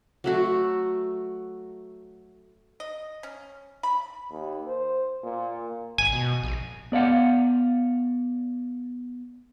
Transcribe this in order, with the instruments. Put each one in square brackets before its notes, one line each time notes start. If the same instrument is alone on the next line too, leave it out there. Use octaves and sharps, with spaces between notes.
[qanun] F#3 A3 F#4
[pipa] D#5
C#4
B5
[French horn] D#2
C5
A#2
[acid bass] G#1 [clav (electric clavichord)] G#5
[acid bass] B2
A#1
[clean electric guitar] B3 D5 F5 F#5